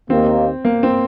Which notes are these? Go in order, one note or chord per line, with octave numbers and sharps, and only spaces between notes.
D#2 D#3 A#3 C4
A#3
C4